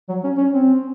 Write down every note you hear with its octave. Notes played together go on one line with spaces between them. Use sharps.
F#3
C#4
C#4
C4